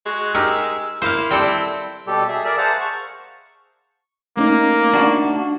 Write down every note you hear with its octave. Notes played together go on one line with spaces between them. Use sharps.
G#3 F#4
D#4 G4 A#4 E6
A#3 E4 C5 F5
G3 C4 A4
B2 G3 G4 A4
G#4 E5
G#4 A#4 D5 E5
G#4 C5 F5 F#5 A5 A#5
C#6
A3 A#3 C#4 D#4
D4 F#4